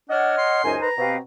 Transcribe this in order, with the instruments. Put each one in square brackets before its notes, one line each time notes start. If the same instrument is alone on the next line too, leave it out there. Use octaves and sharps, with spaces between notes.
[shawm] D4 [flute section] C#5 F6 [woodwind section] D#5 F#5
[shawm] C6
[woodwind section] C#2 F#2 G#5 [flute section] D#4 A#4 C5
[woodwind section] B4 [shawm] A#5
[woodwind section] B2 C4 [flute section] G4 B4 F5